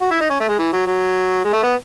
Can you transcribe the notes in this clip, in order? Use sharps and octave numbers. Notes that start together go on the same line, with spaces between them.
F#4
E4
D#4
C#4
A3
G#3
E3
F#3
F#3
G#3
A3
B3